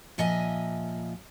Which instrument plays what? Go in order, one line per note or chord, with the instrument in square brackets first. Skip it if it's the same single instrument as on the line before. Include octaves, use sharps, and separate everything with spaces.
[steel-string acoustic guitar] A#2 F3 D#5 E5 G#5